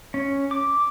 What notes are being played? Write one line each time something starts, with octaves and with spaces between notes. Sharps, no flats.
C#4
D6